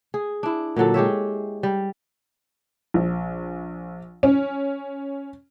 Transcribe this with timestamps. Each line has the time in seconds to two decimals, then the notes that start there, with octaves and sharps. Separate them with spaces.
0.14 G#4
0.43 D4 E4
0.76 A#2 D3 F#3 A4
0.94 G#3 G4 C#5 E5
1.63 G3
2.94 A#1
4.23 C#4